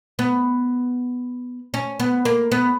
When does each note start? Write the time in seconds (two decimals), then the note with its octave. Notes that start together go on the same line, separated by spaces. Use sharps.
0.19 B3
1.74 C#4
2.00 B3
2.25 A#3
2.52 B3